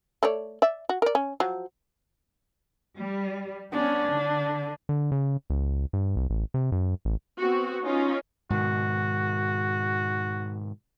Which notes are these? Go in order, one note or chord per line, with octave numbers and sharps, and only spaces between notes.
A3 C#5 D5
D5 E5
F#4
A#4 D5
C#4
F3 F#3
G3
B3 C#4 D4
D3
D3
C#3
C#2
G2
C2
A1
C3
F#2
A1
B3 C4 F#4
C#4 D#4 F4
G#2 B2 D#3 F#4